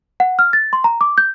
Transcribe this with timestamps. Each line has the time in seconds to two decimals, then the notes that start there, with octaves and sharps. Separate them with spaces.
0.20 F#5
0.39 F6
0.53 A6
0.73 C6
0.84 A#5
1.01 D6
1.18 G6